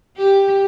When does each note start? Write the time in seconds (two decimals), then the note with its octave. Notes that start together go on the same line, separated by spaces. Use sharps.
0.16 G4